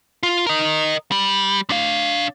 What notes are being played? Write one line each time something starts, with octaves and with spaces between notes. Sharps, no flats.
F4
A#4 D#5
G3
D4 F5